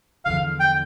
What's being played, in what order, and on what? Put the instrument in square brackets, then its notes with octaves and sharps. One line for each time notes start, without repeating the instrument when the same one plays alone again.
[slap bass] E2 D3 F3 [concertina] F5
[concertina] G5